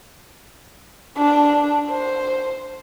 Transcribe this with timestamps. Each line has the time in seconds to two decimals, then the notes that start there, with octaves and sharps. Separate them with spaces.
1.17 D4
1.89 C5